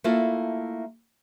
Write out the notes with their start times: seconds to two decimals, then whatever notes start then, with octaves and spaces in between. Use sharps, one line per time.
0.04 A3 A#3 E4 F4 A4